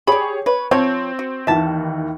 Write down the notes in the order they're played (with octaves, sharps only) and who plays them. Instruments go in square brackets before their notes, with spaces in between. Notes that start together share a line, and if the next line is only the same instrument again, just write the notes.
[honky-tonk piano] G4 G#4 C#5 [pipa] D5 B5
[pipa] B4 [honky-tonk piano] C#5
[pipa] F3 C#5 [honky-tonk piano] C4
[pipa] F#4
[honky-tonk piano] D#2 D#3 E3 [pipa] E5 A5